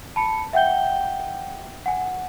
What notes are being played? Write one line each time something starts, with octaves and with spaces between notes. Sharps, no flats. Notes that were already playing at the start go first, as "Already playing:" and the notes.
A5 B5 C#7
E5 F#5 G5 G6 G7
F#5 G#5